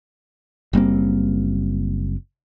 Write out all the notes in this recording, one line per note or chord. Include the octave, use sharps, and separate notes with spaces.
F#1 G3 A#3 C4